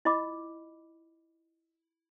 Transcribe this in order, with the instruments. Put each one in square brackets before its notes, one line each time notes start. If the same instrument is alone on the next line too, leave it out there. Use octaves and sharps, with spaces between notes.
[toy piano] E4 F4 D#5 B5 D6